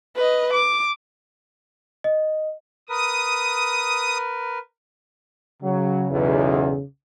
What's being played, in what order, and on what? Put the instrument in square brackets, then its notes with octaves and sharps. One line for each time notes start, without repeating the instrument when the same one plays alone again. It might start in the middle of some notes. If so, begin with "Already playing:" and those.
[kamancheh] B4 D#5
D6
[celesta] D#5
[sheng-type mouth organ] A#4 B4 [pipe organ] D#6
[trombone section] C#3 [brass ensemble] F#3
[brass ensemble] B1 E2